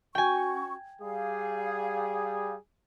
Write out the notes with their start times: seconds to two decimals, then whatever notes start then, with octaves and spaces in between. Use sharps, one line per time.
0.15 C#4 F#4 G5 G#5 C#6
1.02 G3 G#4 F5